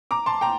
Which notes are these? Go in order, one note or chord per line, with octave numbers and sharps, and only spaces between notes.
A#5 D6
A5 C6
G5 A#5